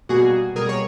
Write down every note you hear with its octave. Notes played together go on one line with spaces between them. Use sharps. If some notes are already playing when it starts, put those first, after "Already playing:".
B2 G3 A#3 F#4 G#4
B2 G3 A#3 G#4 A#4
C#5